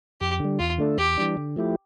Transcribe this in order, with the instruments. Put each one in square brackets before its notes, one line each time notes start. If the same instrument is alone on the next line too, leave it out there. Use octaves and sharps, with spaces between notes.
[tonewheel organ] F2 [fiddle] G4
[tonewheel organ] D3 G3
[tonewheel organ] E2 [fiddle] F4
[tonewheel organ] D3 A3 D4 A4
[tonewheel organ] E2 [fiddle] G4
[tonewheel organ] E3 G3 D4
D3
F3 A3 E4 G4